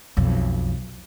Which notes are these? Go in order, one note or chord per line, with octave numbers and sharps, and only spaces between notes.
B1 F2